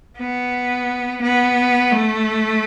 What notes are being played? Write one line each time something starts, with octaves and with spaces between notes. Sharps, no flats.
B3
B3
A3